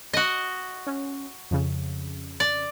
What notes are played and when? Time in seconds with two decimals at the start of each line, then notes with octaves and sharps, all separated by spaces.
0.13 F#4 D#5
0.87 C#4
1.51 F2 C#3
2.40 D5